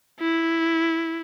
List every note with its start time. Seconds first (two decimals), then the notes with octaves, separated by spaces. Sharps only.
0.20 E4